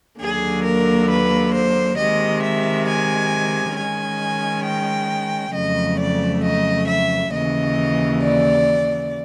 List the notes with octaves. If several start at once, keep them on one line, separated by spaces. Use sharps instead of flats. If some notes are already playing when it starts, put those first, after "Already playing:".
D#2 D3 F#3 A#3 G#4
A#4
B4
C5
C3 D#3 G#3 D#5
E5
G#5
D#3 G#3 C#4 G#5
G5
F2 C#3 F#3 A3 D#5
D5
D#5
E5
D#2 C#3 E3 D#5
D5